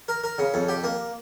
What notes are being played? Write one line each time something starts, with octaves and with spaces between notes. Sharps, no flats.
A#4
A#4
C#3
F2
G4
A#3